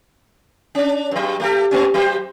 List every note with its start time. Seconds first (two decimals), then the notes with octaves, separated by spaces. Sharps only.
0.75 C#4 D4
1.11 G2 F#3
1.40 A3 G4 A4
1.71 A3 B3 C#4
1.94 F#3 G4 C5